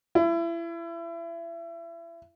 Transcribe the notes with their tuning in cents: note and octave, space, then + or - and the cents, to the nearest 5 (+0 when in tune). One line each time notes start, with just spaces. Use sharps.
E4 +30